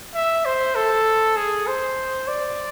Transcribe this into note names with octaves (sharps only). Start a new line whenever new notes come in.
E5
C5
A4
G#4
C5
D5